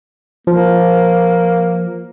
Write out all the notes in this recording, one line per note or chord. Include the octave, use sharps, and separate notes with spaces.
F3 A#3